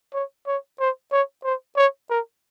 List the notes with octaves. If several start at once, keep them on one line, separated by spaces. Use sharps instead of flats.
C#5
C#5
C5
C#5
C5
C#5
A#4